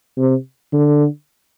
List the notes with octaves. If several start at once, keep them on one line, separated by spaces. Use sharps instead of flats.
C3
D3